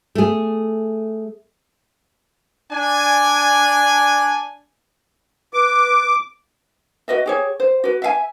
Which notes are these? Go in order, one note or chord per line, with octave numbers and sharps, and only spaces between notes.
A3 G#4
D4 G#5
B4 D6
F#4 B4 D#5 E5
G4 G#4 C#5
C5
F#4 B4
E5 F5 G#5